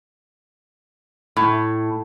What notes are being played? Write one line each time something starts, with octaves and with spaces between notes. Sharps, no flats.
A2